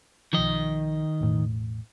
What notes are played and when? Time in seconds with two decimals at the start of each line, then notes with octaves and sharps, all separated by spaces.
0.33 B1 D#3 F3 D#5
1.21 E1 A1 A2